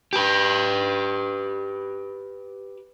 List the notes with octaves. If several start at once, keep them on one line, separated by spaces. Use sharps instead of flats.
G4 B4